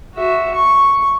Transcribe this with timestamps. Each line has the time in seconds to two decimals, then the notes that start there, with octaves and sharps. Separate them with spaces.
0.14 F#4 E5
0.55 C#6